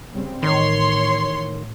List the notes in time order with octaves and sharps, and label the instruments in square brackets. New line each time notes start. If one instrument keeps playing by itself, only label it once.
[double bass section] C#3 G3 C4
[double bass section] A1 [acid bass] D#3 [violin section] C#5 C6